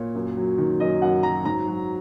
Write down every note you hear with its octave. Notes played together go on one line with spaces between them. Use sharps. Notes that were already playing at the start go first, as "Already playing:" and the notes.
Already playing: A#2 C#5
F#2
F#3
D#3
F#2 D#5
F#2 F#5
F#3 A#5
G#2 A#5
F#3